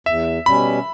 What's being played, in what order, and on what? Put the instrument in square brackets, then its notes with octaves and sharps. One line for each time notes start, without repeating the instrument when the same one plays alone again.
[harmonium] E2 [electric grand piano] E5
[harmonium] B2 G3 C#4 [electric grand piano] B5